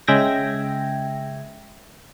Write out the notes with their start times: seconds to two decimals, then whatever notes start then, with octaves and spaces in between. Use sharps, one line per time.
0.08 C#3 G#3 E5 G5 G#6 A#6